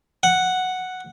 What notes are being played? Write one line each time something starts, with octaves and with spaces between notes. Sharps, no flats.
F#5